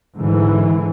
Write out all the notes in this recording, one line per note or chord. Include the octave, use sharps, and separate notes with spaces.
G#2 D3 E3